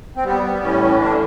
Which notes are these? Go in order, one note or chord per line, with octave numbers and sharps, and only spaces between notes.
C4
G3 B3
G3
A2 C#4
E3
D3 D4